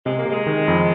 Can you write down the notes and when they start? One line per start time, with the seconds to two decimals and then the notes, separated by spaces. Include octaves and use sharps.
0.05 C3 G#3
0.18 A#3
0.25 C3 G#3
0.46 D#3
0.68 F2